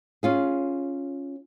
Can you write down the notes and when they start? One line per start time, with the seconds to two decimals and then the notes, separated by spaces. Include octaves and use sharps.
0.23 C#4 F4 G#4